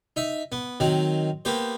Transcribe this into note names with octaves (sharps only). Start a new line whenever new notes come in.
D#4 E5
B3
D#3 F#3 C4
A#3 B3 G4 C5